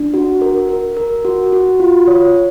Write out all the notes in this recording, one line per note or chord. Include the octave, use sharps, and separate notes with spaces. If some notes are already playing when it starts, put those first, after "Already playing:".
Already playing: D4
F#4
A#4
A#4
A#4
F#4
F#4
F4
C#5
C#5